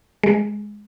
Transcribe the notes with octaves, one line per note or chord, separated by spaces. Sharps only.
G#3